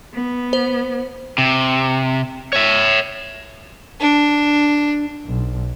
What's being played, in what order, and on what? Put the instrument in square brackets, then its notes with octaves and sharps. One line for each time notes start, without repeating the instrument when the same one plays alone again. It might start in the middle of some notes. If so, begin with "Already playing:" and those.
[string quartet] B3
[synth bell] C5
[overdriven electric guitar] C3
C#5 E5
[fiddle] D4
[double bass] B1